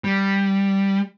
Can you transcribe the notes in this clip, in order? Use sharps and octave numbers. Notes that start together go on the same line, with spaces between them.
G3